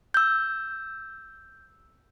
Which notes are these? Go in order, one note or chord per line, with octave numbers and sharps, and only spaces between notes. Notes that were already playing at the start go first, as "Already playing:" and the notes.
E6 G6